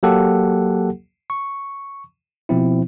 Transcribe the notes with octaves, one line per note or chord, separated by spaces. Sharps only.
F#3 A#3 G4 A4 F#5
C#6
B2 F3 C4 E4